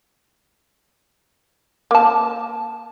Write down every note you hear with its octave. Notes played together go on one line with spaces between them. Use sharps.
A#3 A5